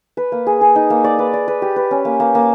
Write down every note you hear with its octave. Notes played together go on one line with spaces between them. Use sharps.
B4
A#3
G#4
G#4
D#4
A#3
D5
B4
D5
B4
G4
B4
C#4
A#3
A#3
A#3